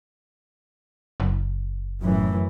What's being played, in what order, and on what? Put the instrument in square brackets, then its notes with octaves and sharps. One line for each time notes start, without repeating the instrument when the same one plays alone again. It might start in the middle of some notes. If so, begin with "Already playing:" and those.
[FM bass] F#1
[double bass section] F#2 A2 E3